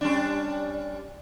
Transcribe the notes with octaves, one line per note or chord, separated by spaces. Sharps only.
G3 C#4 D4